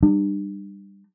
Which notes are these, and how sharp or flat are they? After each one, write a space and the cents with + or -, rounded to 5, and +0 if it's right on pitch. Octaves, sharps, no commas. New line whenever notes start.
G3 +5 D4 +40